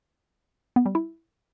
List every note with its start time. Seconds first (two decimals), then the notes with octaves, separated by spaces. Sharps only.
0.76 B3
0.86 G3
0.95 E4